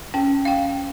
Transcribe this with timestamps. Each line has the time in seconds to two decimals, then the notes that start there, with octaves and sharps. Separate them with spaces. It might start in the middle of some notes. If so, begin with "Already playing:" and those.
0.14 C#4 G5
0.45 F5 G5